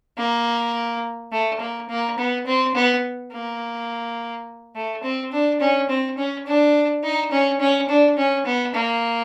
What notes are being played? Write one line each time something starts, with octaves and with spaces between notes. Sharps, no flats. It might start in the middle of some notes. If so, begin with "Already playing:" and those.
A#3
A3
A#3
A#3
B3
C4
B3
A#3
A3
C4
D4
C#4
C4
C#4
D4
D#4
C#4
C#4
D4
C#4
B3
A#3